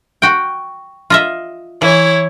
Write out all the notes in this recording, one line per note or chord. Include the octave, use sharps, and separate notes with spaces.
F#4 G5
F4 D#5 E5
E3 E4 C#5